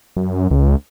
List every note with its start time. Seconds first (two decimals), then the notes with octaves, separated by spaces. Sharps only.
0.17 F#2
0.51 C#2